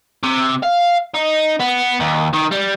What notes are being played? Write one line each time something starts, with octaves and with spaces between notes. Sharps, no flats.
C3
F5
D#4
B3
D#2
D#3
G3